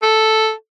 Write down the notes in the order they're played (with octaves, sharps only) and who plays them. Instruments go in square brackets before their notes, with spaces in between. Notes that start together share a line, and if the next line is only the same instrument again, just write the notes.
[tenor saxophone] A4